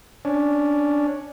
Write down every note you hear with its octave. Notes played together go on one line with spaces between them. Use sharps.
C#4 D4